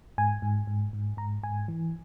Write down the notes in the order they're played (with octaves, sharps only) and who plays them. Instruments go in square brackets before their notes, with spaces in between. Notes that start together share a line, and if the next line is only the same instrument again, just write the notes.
[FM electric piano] G#2 G#5
G#2
G#2
G#2
G#2 A#5
G#2 G#5
E3